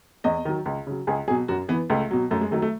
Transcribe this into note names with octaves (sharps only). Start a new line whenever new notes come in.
E2 D#5
D#3 F#3
C#2
C#3 F#3
C#2 G#4
B2 F#3 G#4
F#2 F#4
E3 B3
C#2 A3
B2 F#3
F#2 A3
G#3
D#3 F#3 A3
A3